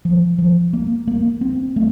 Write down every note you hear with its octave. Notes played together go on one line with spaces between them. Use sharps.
F3
F3
A#3
A#3
C4
A3